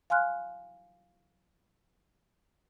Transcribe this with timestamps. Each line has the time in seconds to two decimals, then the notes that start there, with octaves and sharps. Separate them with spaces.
0.10 F5 G#5 C6 F6 F#6